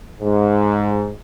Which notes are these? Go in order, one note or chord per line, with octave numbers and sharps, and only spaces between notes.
G#2